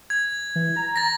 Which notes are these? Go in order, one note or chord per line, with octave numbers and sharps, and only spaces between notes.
G#6
E3
A#5
A6 A#6